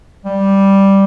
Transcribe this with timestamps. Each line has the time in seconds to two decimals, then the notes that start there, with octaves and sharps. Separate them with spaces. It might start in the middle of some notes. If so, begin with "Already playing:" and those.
0.25 G3